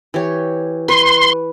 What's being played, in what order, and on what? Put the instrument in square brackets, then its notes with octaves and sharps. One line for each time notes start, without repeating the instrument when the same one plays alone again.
[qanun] E3 G4 C#5
[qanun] B4 C#6 [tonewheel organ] C6